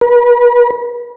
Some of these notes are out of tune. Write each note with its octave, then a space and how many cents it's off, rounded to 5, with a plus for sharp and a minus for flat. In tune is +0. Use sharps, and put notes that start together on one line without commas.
B4 -40